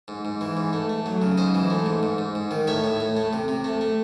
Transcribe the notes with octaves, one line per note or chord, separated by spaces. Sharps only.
G#2
G#2
E3
G#2
A3
A3
F#3
C#3
G#2 C5 D#5
E3
A3
G#2
G#2
G#2
G#2
D#3
A2 C#5 E5
A2
A2
A3
C3
C3
A3
A3